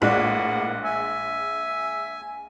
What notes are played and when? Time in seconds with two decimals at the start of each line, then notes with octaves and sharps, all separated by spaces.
0.02 A#1 A2 G#3 A#3 D5 F#5
0.84 E5 G#5